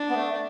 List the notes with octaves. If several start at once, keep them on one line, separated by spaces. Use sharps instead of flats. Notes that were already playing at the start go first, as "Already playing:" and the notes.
Already playing: D4
B3
A3